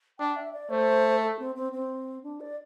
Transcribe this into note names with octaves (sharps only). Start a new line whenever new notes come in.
D4 G5
G5
E5
D5
A3 C5
A4
C4
C4
C4
D4
D5